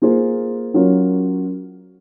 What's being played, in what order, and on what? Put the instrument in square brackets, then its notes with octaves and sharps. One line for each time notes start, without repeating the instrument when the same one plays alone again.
[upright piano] A#3 F4 G#4 C5
F#3 C#4 F4 A#4 C#5